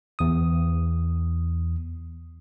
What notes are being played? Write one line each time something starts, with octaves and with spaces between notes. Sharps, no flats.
E2 D#6